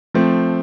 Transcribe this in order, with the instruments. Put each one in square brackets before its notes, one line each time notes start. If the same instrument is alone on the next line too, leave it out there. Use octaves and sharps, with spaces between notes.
[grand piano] F3 A3 C4